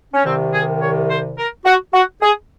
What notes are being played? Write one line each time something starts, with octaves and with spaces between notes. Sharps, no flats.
C#4
C2 C3 D#3 C4
G#4
C#5
C5
A#4
F#4
F#4
G#4